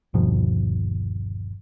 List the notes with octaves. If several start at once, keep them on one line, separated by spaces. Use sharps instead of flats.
G1 D#2 B2 F3